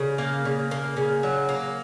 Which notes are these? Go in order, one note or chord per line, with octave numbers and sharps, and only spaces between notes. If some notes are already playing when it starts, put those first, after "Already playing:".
Already playing: C#3
A#3
C#3
A#3
C#3
F#3
A#3